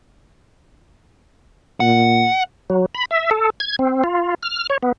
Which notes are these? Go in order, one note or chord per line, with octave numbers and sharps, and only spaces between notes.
A#2 F#5
F#3
B5
E5
A4
G#6
C4
F4
F6
C#5
B3